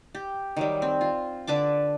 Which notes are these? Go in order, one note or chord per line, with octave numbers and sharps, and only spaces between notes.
G4
D#3 F#3 G3
C4
F4
D3 B4 A5 D6